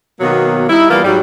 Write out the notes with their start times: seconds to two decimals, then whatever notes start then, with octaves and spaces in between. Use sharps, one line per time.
0.20 B2 D#3 F#3 A#3 B3
0.69 G3 D#4 E4
0.89 E3 G3 A#3 B3 F4
1.04 G#2 F#3 G3